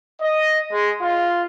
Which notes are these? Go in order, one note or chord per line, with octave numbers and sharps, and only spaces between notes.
D#5
G#3
F4